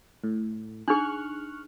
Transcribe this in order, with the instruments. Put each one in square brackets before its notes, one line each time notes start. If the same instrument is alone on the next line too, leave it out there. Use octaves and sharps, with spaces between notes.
[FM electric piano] A2
[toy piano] D4 D#4 G#4 [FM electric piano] C#6 F6 F#6